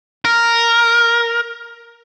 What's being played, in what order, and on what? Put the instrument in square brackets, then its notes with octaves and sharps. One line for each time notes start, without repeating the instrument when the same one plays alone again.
[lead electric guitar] A#4